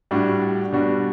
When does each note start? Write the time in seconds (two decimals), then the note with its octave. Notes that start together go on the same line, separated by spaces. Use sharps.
0.11 A2 G3 D4 F#4
0.73 B2 G3 D4 F#4